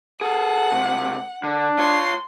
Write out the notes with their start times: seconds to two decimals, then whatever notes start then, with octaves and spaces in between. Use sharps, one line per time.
0.21 G#4 A4 F#5
0.72 C#2 C3
1.44 D3 D4
1.79 F4 C#5 C6